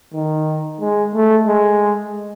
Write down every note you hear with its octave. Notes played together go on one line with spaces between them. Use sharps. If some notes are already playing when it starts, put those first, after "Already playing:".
D#3
G#3
A3
G#3